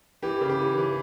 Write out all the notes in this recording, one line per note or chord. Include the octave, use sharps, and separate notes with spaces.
E3 G4
C#3
G4
E3
E3